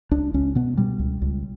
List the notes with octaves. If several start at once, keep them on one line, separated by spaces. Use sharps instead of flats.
C#2 D4
C#2 C#4
B2 B3
B2 G3
C#2
C#2